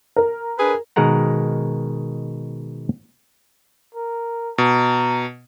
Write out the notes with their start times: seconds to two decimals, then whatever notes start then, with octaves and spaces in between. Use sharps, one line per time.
0.16 A#4
0.59 D4 G#4 B4
0.96 B2 D#3 G#3 A#4 F#5 A#5
3.95 A#4
4.58 B2 A#5